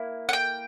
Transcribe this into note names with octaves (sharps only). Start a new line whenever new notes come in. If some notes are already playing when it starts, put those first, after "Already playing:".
Already playing: A#3 E4
F#5
G5